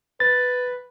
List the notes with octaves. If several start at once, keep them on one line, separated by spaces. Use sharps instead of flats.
B4 A6